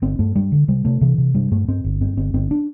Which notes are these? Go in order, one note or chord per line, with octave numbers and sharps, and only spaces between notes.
G1 C4
G2 A3
G2 G3
D3
C3 G3
C3 A3
C3 E3
C3
G2 G3
G2 A3
G2 C4
G1
G2 C4
G1 C4
G1 C4
D4